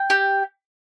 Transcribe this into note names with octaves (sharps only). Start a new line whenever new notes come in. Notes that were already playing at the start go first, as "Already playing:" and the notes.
Already playing: G5
G4